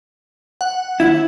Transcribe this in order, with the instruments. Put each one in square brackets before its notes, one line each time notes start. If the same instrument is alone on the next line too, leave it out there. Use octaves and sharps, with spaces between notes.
[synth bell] F#5
[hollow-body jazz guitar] D#2 E4 [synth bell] G#6